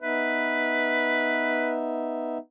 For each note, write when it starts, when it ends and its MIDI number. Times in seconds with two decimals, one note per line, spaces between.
0.02 2.38 59
0.02 2.38 63
0.02 1.75 71
0.02 2.38 76